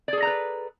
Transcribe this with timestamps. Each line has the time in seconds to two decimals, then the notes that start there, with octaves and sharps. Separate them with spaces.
0.08 D5
0.13 G#4
0.18 A4
0.22 A#5
0.27 B4